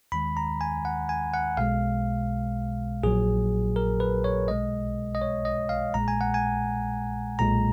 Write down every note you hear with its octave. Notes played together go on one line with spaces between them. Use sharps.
D#2 D#3 G#3 B5
A#5
G#5
F#5
G#5
F#5
B1 B2 G#3 F5
A#1 A#2 F#3 G#4
A#4
B4
C#5
B1 B2 G#3 D#5
D#5
C#5
D#5
F5
A#1 A#2 G#3 A#5
G#5
F#5
G#5
B1 A#2 G#3 A#5